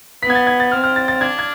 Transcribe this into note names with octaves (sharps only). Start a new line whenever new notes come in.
B3 B6
G#6
A6
G#6
A6
C4 F6
F6
A6
A6
D4 G#6
G#6